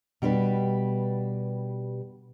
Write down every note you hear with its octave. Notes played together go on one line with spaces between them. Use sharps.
B2 G3 D4 G4 B4